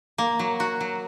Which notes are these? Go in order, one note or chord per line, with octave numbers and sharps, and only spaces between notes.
A#3
F#3
F#4
F#3